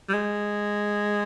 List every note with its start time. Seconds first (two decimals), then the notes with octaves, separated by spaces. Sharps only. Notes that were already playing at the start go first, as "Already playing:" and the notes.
0.09 G3
0.14 G#3